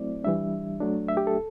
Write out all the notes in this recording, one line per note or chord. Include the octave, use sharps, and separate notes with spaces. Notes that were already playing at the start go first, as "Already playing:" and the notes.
Already playing: F#3 A3 C4 E4 D5
E3 G3 D4 E5
F#3 A3 D4
E5
G4
A4